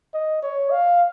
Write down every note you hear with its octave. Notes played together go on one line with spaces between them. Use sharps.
D#5
C#5
F5